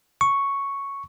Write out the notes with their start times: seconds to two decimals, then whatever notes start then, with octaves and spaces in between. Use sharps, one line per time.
0.21 C#6